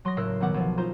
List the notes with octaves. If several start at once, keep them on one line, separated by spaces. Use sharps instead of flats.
F#3 C6 D#6 A#6
F#1 A2 A#4 E6 F#6 C7
B1 D#3 B3 D#4 F#5 D6
B1 F3
D#4 F4 C5 A#5